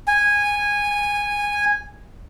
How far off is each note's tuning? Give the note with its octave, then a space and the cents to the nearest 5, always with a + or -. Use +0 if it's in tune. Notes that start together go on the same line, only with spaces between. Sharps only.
G#5 -15